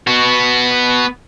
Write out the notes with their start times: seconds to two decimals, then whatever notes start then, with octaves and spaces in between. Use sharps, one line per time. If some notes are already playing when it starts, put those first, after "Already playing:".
0.07 B3 F#4